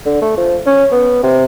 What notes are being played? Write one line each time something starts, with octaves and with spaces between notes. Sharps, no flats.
D3
A3
F3
C#4
B3
C3